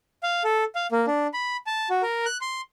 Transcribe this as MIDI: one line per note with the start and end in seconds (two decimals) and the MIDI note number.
0.23 0.43 77
0.44 0.64 69
0.75 0.87 77
0.92 1.06 58
1.07 1.27 62
1.34 1.57 83
1.67 1.89 81
1.90 2.02 66
2.02 2.26 70
2.26 2.37 90
2.41 2.61 84